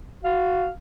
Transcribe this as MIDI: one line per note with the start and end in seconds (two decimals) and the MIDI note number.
0.24 0.70 66
0.24 0.70 77